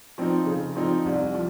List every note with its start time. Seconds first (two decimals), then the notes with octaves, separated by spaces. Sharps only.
0.18 F3 C4 D#4
0.46 C#3
0.76 F3 C4 D#4
1.05 C2
1.34 F3